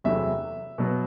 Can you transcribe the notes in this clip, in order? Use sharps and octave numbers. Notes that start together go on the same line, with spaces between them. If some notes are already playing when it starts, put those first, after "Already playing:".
E2 C3 F#3 A3 E4 E5
B2 F#3 B3